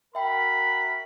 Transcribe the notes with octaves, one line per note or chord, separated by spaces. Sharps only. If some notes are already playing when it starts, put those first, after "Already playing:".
F#4 A#4 E5 G5 B5